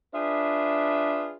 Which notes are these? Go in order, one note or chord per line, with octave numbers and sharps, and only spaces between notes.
D4 F4 G#4 B4 E5